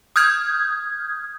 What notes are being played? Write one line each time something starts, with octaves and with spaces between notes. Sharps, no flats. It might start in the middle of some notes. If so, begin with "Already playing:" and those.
D#6 F6 G6 G#6